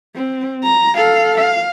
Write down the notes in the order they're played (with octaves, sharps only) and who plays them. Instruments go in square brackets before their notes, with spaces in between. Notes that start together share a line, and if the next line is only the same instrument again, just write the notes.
[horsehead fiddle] C4
A#5
A4 F5
F5